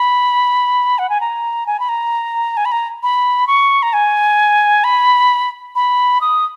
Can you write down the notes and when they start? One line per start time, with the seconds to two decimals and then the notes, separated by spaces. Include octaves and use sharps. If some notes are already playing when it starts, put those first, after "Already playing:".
Already playing: B5
0.99 F#5
1.10 G#5
1.21 A#5
1.67 G#5
1.80 B5
1.89 A#5
2.57 G#5
2.65 B5
2.72 A#5
3.03 B5
3.47 C#6
3.83 A#5
3.93 G#5
4.84 B5
5.75 B5
6.21 D#6